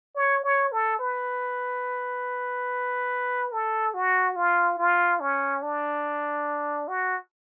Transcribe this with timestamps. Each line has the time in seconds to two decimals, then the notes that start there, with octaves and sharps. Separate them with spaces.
0.16 C#5
0.44 C#5
0.72 A4
1.00 B4
3.52 A4
3.94 F#4
4.36 F4
4.78 F4
5.20 C#4
5.63 D4
6.88 F#4